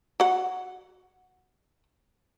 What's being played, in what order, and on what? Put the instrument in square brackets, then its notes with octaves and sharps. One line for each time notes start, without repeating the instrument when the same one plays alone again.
[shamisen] F#4 F#5